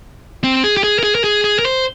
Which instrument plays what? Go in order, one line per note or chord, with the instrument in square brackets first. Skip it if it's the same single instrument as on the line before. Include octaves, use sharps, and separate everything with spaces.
[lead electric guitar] C4
G#4
G4
G#4
A#4
G#4
A#4
G#4
G#4
A#4
C5